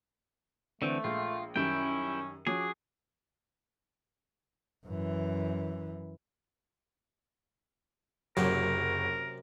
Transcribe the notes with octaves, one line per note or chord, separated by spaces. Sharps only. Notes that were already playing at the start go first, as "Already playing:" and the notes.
D3 E3 A3 C4
A#1 G#3 F4 G6
F#2 D#3 G3 C#4 E4 G5
F3 C#4 F#4 G#4 D6
F#2 E3
F#1 F#2 C3 F#3 F#4 G4 A#4